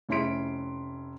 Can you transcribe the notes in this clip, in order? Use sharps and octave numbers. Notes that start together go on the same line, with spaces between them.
F1 C#4 E4 C6 B6 D7